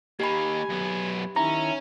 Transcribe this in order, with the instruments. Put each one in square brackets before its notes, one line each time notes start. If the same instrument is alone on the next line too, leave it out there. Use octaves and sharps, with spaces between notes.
[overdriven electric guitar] A#3 D#4 [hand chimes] G4 B5 [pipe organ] G#5
[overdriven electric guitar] F#2 B3
[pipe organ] D#3 E4 [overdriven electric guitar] C#4 [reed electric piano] A#5